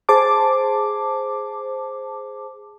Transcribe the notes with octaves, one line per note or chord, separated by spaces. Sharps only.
G#4 C5 A5 D6